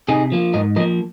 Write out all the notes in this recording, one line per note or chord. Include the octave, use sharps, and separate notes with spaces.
C3 D#4 G#4
F3 A#3
G#2 A#4 D#5
F3 A#3 A#4 D#5